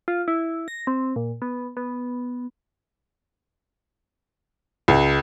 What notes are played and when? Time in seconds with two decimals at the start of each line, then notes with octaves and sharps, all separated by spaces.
0.08 F4
0.28 E4
0.68 A#6
0.87 C4
1.16 A#2
1.42 B3
1.77 B3
4.88 C#2